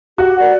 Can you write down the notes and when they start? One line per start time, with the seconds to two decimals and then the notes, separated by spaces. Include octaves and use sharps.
0.18 F#4 G4
0.35 A#4 D5 F#5